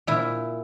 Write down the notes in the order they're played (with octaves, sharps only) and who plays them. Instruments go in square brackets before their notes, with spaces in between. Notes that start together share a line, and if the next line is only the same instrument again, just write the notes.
[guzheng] A#2 E4